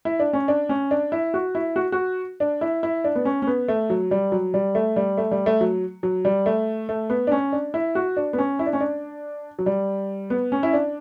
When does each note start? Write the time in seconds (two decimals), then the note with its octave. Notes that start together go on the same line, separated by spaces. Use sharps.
0.05 E4
0.19 D4
0.33 C#4
0.48 D4
0.69 C#4
0.91 D4
1.12 E4
1.34 F#4
1.55 E4
1.76 F#4
1.92 F#4
2.40 D4
2.61 E4
2.83 E4
3.04 D4
3.15 B3
3.25 C#4
3.42 C#4
3.47 B3
3.68 A3
3.90 F#3
4.11 G3
4.32 F#3
4.54 G3
4.75 A3
4.96 G3
5.17 A3
5.31 G3
5.46 A3
5.61 F#3
6.03 F#3
6.25 G3
6.46 A3
6.89 A3
7.10 B3
7.27 D4
7.31 C#4
7.52 D4
7.74 E4
7.95 F#4
8.17 D4
8.33 B3
8.38 C#4
8.59 E4
8.66 D4
8.73 C#4
8.80 D4
9.59 F#3
9.66 G3
10.30 B3
10.52 C#4
10.63 E4
10.73 D4